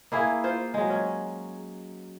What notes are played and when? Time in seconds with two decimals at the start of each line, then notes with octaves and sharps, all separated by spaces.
0.12 A#3 E4 G#4
0.44 F4 C5 F5
0.74 F#3 G#3
0.90 C#4